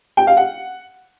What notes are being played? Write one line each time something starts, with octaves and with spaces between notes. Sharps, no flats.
G5
F5
F#5